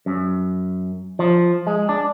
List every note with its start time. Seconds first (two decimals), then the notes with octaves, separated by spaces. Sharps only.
0.06 F#2
1.19 F3
1.67 G#3
1.89 D4